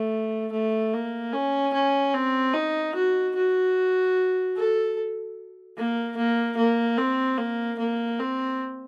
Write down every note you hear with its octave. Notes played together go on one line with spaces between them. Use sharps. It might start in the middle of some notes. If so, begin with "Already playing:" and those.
Already playing: A3
A3
A#3
C#4
C#4
C4
D#4
F#4
F#4
A4
A#3
A#3
A#3
C4
A#3
A#3
C4